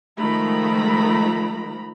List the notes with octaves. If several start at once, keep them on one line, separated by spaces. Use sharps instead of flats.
D#3 F3 G#3 A3 A#5 B5